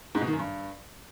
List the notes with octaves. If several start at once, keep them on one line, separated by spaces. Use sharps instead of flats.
G#2
B2
D#3
F#2
G2